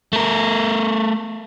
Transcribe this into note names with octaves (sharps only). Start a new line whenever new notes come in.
A3 A#4